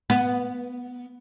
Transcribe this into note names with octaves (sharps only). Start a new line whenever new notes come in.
B3